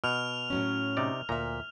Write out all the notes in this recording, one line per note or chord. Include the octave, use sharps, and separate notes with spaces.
B2 F6 F7
A2 F#3 C#4
C3 D#4 D5
D2 A#2 E5 A#5